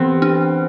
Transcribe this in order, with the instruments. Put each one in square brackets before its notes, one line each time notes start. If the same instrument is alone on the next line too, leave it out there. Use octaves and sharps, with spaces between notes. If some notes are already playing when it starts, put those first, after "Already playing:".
Already playing: [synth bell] E3 G4 [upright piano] B3 C4
[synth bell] D4